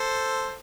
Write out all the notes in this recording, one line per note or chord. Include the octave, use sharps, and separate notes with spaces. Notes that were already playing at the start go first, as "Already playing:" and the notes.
Already playing: A4 C5